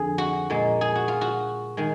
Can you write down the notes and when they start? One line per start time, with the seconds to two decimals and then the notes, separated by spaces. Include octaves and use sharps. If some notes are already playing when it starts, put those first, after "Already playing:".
Already playing: F2 D3 G#4
0.18 F#4
0.50 A#2 G#3
0.81 G#4
0.95 F#4
1.08 F4
1.21 F#4
1.77 D#3 G#3